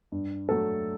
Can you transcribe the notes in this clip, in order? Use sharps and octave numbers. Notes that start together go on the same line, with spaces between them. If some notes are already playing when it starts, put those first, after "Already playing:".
G2
F#3 A3 A4